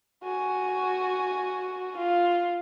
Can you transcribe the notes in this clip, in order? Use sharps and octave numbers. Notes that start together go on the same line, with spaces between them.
F#4 G#5
F4